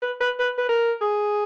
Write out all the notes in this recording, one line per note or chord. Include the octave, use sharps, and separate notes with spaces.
B4
B4
B4
B4
A#4
G#4